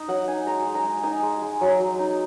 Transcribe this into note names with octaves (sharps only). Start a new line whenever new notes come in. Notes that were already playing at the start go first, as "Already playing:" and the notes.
Already playing: D#4 D#5
F#3 F#5
D#4 G#5
G#3 A#5
G#3
A#5
G#3
D#4 G#5
G#3
G#3
F#3
F#3
D#4